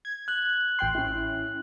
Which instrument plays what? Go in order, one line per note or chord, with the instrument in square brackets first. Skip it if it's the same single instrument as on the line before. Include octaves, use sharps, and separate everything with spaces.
[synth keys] G#6
[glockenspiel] F#6 F#7
[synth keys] A1 G5 C6
C#4 E4